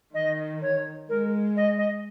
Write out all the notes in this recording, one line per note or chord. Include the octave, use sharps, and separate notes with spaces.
D#3 D#5
C#5
G#3 A#4
D#5
D#5